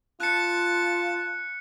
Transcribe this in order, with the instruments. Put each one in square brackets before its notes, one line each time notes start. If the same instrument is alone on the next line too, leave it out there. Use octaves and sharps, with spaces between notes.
[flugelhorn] F4 [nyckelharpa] A5 [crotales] F#6 C#7